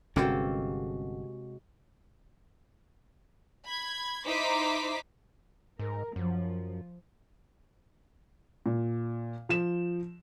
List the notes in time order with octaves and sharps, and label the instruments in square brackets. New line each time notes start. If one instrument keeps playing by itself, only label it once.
[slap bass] G1 C#4 [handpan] C3 G#3 F#4 [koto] A#3 C4 A4
[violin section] B5 G#6
D#4 E4 C5 C6 D6 B6
[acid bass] G#2 [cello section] A#4
[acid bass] F#2 [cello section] F3
[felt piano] A#2
F3 E7